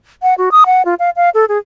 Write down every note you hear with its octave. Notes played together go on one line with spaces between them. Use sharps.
F#5
F#4
D#6
F#5
F4
F5
F5
A4
G#4